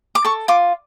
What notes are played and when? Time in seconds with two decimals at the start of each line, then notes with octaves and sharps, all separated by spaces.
0.15 D6
0.25 A4 C#6
0.48 F4 D6